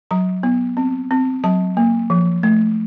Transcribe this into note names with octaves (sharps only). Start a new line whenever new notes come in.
F#3 A#5
B3
C4
C4
F#3 A5
A#3
F3
A3